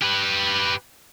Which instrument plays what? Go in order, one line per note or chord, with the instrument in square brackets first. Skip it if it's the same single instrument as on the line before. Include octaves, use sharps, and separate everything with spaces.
[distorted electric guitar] G4 B4